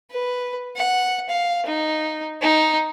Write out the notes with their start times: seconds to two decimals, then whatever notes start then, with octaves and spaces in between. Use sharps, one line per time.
0.11 B4
0.76 F#5
1.29 F5
1.66 D#4
2.42 D#4